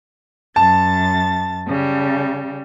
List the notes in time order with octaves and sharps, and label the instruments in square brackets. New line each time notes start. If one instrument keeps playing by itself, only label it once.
[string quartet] F#2 A6 [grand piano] A5
[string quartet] C#3 G3